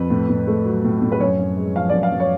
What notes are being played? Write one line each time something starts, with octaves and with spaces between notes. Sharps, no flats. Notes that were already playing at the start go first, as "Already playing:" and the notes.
Already playing: F2 B4
A2
A2
A3
F#3
A2
A2
B4
F#2 C#5
F#2
G#3
F3 F5
F#2 D5
F5
F#2
C#5